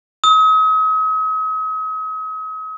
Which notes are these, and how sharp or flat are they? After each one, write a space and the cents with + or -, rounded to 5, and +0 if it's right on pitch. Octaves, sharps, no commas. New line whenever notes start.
D#6 +40